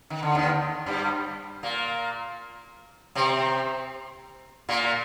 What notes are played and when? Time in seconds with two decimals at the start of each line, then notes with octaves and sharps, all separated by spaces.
0.10 D#3
0.23 D3
0.35 D#2 D#3
0.86 G2 G3
1.63 A#2 A#3
3.15 C3 C4
4.69 A#2 A#3